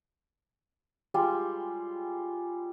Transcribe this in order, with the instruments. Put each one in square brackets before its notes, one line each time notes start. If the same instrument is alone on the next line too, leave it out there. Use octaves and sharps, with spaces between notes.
[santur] G3 G#3 F4